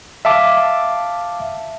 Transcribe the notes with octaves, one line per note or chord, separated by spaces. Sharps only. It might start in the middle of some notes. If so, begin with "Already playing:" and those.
E5 F5 A5 D6